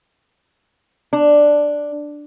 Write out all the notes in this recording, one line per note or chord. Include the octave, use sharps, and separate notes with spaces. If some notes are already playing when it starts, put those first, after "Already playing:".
D4